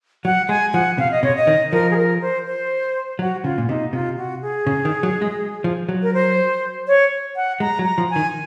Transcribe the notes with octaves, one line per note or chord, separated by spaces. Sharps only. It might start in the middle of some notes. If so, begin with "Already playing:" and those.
F#3 F#5
G#3 G#5
F3 F#5
C3 F5
D#5
C3 C#5
D#5
D#3
F3 A#4
G#4
A#4
C5
C5
F#3 F#4
C#3 F4
A#2
C3 D#4
C3 F4
F#4
G#4
C#3
D#3
F#3
G#3
F3
F#3
A#4
C5
C#5
F#5
G#3 A#5
F#3
A#5
F3
G#5
D#3